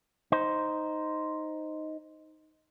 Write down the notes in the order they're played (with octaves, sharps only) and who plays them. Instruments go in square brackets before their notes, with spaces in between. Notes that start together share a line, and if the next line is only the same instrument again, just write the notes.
[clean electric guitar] D#4 C5